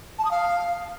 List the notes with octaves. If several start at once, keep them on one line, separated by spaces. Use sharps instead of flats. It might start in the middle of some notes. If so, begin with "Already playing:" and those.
A5
D#6
F5